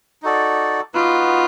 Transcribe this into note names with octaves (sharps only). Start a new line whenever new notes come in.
D#4 F#4 A4 D5
B3 D#4 F4 F#4 B4